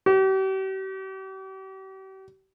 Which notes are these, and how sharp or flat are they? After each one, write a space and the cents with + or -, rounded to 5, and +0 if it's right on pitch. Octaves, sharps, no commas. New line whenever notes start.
G4 -40